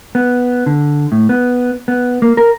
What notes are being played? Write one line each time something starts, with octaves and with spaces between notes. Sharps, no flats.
B3
D3
A2
B3
B3
A#3
A#4